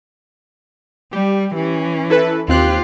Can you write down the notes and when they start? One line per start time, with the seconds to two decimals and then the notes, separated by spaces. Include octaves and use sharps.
1.13 G3 G4
1.55 E3 C#4
2.10 E4 A4 B4
2.48 D#2 C4 F4 G4 F#6